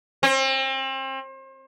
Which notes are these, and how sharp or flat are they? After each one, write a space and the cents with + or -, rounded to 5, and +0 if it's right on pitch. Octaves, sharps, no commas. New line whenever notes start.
C4 +35